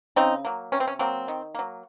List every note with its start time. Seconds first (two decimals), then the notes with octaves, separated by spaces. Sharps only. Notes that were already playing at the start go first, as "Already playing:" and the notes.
0.16 C#3 C4 D#4
0.45 F#3 A#3
0.72 C3 C#4
0.80 C4
0.88 C#4
0.99 F#3 A#3 C4
1.28 D#3
1.55 F#3 A#3